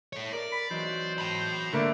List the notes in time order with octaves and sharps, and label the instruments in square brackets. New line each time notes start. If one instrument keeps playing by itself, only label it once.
[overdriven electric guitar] A4 C#5
[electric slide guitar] A#4 [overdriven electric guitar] D5
[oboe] B5
[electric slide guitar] E2 F#3 D#4 [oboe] C5
[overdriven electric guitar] A5 B5
[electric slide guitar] G#2 [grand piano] D3 A3 A#3